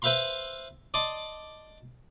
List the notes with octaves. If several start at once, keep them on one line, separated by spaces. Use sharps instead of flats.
B4 C5 E5 F5 B5 C6
D5 D#5 A5 C6